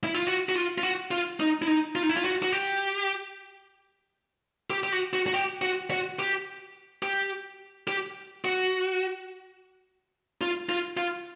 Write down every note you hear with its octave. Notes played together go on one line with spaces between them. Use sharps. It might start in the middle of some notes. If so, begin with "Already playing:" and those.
E4
F4
F#4
F#4
F4
F4
F#4
F4
D#4
E4
D#4
F4
D#4
E4
F4
F#4
F#4
G4
G4
G4
F#4
F#4
F#4
G4
F#4
F#4
G4
G4
G4
F#4
F4
F4
F4